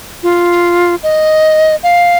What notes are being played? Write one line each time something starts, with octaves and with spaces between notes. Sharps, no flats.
F4
D#5
F5